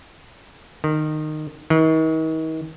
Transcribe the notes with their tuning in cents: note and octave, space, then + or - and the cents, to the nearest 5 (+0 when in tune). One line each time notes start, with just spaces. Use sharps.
D#3 -20
D#3 +40